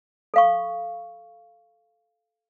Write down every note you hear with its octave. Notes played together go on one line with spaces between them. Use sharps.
A4 F5 C#6